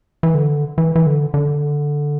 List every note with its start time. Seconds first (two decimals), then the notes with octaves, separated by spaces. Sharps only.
0.23 E3
0.35 D3
0.78 E3
0.96 E3
1.06 D3
1.34 D3